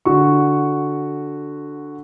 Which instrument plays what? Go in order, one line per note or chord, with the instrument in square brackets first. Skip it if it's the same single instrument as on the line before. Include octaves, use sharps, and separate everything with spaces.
[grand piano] D3 F#4 C#6